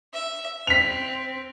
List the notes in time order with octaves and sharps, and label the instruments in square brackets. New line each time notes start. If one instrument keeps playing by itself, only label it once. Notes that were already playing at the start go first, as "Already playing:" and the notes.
[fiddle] E5
[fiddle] C4 [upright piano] B6 F7